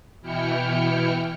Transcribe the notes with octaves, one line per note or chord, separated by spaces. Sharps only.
B2 E3 E4 G5 F6 C#7